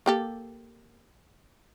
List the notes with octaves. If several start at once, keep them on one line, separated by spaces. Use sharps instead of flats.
A#3 G4 A4